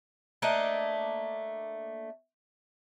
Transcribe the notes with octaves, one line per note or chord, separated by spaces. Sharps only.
A3 A#3 D4 D#5